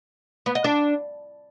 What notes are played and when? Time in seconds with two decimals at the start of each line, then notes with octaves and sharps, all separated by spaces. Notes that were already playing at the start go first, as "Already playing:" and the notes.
0.46 B3
0.55 D#5
0.64 D4